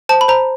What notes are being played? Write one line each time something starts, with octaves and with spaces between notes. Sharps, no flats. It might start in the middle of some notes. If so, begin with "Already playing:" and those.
C5 A5
B5
C5 A#5